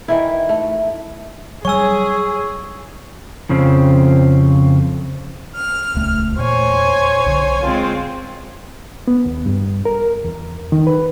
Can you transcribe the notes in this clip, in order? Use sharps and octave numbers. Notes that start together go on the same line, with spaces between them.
D#3 E3 E4
A3
F#3 G3 G#4 C#5 G#5 C#6 E6
F2 C#3 F3 C4
F6
D#1 C#2 A3
E2 A#2 C5 C#5 G#5
B1 D3
G#3 C4 F4
B3
D#2
G2
A#4
E2
D#3
B4